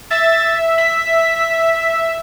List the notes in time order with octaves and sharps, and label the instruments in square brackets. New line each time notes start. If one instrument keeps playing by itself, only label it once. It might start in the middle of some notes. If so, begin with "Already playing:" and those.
[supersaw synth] E5 [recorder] A6
[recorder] B6